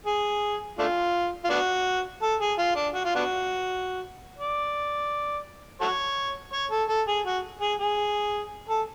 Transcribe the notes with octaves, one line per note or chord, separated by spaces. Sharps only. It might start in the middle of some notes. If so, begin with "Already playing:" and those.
G#4
A3 D4 F4
F4
B3 D4 F#4
A4
G#4
F4
D4
F#4
F4
B3 D4 F#4
D5
F#4 A4 C#5
C#5
A4
A4
G#4
F#4
G#4
G#4
A4